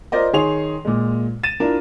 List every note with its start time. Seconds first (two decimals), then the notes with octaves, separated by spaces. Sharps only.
0.12 F4 A#4 C5 D5 D#5
0.33 D#3 G#4 C#5 C6 F7
0.85 A#2 G#3
1.43 A6 D#7 E7
1.60 D4 E4 F4 A#4